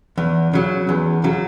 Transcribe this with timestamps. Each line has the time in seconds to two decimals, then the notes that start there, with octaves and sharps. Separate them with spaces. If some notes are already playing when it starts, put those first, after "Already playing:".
0.18 E2
0.53 C#3 F#3
0.89 E2
1.24 C#3 F#3